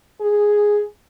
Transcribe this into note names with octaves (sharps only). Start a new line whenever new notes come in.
G#4